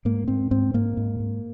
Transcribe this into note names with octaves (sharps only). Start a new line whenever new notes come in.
G#2 A#3
G#2 C4
G#2 C4
G#2 A#3
G#2
G#2